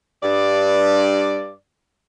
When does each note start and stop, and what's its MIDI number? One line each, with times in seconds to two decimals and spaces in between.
0.23 1.55 43
0.23 1.55 74